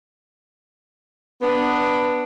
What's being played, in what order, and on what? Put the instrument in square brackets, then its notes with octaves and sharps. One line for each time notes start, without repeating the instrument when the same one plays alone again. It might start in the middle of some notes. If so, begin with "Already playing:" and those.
[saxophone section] B3 [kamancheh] D4